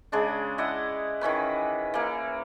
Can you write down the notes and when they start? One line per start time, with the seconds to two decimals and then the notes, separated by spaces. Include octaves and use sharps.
0.12 C#3 G#3 D4
0.58 E4 D5 D#5 F#5
1.21 D#3 E3 C#4 B4
1.94 E3 A#3